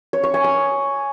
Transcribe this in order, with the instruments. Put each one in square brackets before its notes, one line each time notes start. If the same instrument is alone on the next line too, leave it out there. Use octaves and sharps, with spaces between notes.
[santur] C#5
C#6
G#5
D#6